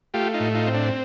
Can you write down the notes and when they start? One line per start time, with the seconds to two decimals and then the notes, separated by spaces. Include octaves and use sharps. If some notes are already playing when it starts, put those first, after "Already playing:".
0.14 A3 F4 G4
0.34 D#4 F4
0.40 A2
0.55 D#4 F4
0.67 C4
0.75 D4